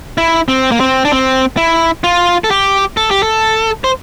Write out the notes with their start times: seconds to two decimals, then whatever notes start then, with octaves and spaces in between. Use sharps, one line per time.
0.18 E4
0.48 C4
0.72 A#3
0.80 C4
1.05 D4
1.12 C4
1.57 E4
2.04 F4
2.44 A4
2.51 G4
2.97 A4
3.11 G4
3.23 A4
3.84 C5